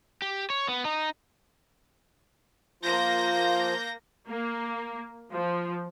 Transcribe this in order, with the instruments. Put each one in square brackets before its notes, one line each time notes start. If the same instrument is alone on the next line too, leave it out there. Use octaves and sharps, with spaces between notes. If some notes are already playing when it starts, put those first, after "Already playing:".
[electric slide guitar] G4
C#5
B3
D#4
[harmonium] F3 F4 [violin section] A#3 G6 A#6
[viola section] A#3
F3